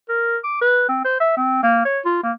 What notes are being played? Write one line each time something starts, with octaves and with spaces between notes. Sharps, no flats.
A#4
D6
B4
C4
C5
E5
C4
A#3
C#5
F4
A#3